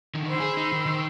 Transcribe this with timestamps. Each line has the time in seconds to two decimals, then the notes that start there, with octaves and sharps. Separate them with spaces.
0.15 D3 D#3
0.27 C5 B5 E6
0.40 G#4
0.57 D#4
0.72 D#3
0.86 D#3